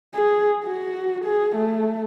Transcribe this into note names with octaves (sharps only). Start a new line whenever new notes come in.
G#4
F#4
G#4
A3